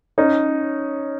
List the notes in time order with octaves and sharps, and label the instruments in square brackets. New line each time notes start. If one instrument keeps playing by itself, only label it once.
[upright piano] C#4 D#4